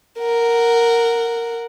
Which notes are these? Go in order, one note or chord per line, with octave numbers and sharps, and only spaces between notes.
A#4 F#5